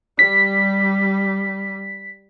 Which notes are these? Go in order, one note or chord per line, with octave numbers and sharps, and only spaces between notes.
G3 B6